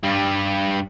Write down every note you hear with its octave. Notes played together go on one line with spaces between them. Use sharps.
G2 G3